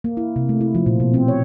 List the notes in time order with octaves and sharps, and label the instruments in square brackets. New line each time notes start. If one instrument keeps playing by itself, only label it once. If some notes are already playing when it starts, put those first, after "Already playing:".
[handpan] A#3
E4
C3
A3
E4
F3
A#2
B2
C4
C#5